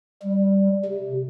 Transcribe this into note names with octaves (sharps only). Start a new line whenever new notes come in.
G3
C3